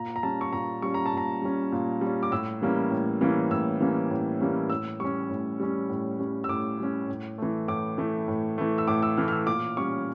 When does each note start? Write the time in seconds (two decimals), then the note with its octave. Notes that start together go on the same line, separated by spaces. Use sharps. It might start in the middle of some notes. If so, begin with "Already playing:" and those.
Already playing: A#2 A#5
0.16 A#5
0.23 G3 C#4 A5
0.41 C#6
0.53 A#2 A#5
0.82 G3 C#4 C#6
0.94 A#5
1.06 A5
1.13 A#2 A#5
1.42 G3 C#4
1.72 A#2
2.01 G3 C#4
2.23 D6
2.32 A2 E6
2.62 E3 G3 A#3 C#4
2.91 A2
3.21 E3 G3 A#3 C#4
3.50 A2 E6
3.81 E3 G3 A#3 C#4
4.11 A2
4.40 E3 G3 A#3 C#4
4.70 A2 E6
5.00 G3 C#4 C#6
5.29 A2
5.60 G3 C#4
5.89 A2
6.19 G3 C#4
6.44 E6
6.49 A2 D6
6.79 G3 C#4
7.08 A2
7.38 E3 A3
7.68 A2 D6
7.98 E3 A3
8.28 A2
8.58 E3 A3
8.78 E6
8.88 A2 D6
9.03 E6
9.17 E3 A3 F6
9.28 F6
9.32 E6
9.47 A#2 D6
9.77 G3 C#4 C#6